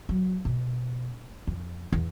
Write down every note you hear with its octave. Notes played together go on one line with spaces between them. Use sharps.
F#3
B2
F2
E2